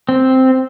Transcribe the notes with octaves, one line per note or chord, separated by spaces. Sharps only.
C4